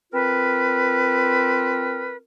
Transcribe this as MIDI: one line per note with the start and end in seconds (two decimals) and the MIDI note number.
0.13 2.16 60
0.13 2.16 65
0.13 2.16 70
0.13 2.16 71